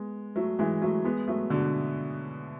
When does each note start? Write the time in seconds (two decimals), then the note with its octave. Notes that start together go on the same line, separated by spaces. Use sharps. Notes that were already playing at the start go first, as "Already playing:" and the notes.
Already playing: G#3 B3
0.36 F#3 A3
0.59 E3 G#3
0.82 F#3 A3
1.04 G#3 B3
1.28 F#3 A3
1.50 B2 D3